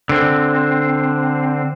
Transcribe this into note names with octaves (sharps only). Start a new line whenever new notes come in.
D3 C4